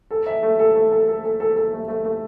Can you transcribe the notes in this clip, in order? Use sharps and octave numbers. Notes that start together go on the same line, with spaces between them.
A4
E5
A3
A4
A3
A4
A4
A4
A4
A4
A3
A3
A3